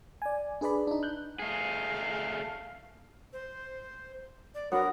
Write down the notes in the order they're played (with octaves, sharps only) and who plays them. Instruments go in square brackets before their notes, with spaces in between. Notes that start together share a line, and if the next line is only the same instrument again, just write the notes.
[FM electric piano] D5 G#5
D4 G#4 B4 D5 B5
D4 D#4
F#6 G6
[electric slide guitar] A3 G#4 [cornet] F5
[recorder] C5
D5
[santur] B3 [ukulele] D4 F#4 C#5 [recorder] A#4